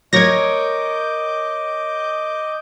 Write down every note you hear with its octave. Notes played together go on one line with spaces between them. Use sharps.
A#4 C#5 D#5 D6 G6 G#6 A#6